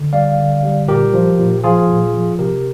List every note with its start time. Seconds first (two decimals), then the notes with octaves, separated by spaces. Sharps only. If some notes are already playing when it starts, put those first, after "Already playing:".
Already playing: D3
0.13 G3 D5 F5
0.38 D3
0.63 G3
0.88 A#2 G4 A#4
1.14 F3
1.39 A#2
1.64 F3 F4 G#4
1.89 A#2
2.13 F3
2.39 C3 G4 A#4